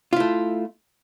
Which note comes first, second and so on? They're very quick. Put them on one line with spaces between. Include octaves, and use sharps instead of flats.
F4 E4 A3